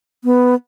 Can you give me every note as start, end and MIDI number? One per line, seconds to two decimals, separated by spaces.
0.24 0.55 59